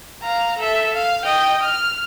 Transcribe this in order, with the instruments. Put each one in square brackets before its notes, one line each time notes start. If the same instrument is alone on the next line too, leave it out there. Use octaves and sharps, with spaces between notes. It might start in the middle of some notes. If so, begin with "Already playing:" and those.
[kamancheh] F5 A#5
A4 E5
F5
D#5 G5
F6